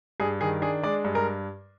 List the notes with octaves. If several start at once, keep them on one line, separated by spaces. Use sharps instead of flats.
G2 G#4
D#3 G#4
D4 G#4
G#3 D5
G2
A#4